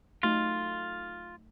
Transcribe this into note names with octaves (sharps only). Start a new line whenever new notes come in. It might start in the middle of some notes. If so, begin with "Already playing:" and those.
F#3 A3 D#4 F4